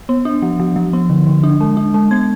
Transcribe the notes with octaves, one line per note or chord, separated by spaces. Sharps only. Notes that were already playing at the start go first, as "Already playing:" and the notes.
B3
D4
F3
F3
F3
B3
D3
D3
D4
G#3
D4
G#3
B3 G#6